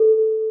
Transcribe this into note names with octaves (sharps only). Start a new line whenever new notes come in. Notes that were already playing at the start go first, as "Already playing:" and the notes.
Already playing: A4